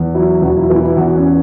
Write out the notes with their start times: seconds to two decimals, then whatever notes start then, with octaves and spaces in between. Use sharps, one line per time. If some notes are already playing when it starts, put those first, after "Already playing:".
Already playing: E2
0.15 F#3 E4
0.42 E1 F#4
0.57 E4
0.69 E3 B3
0.83 E4
0.97 E2 F#4
1.16 C#4